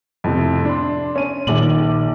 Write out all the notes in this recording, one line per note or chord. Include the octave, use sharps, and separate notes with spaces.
F2 A2 C3
D4 C6
C#4 D#7
A#1 A#2 D#3 D6 F#7